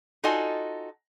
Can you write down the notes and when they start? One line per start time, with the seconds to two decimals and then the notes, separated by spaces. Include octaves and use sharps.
0.23 D#4 F4 F#4 A4 D#5 G#5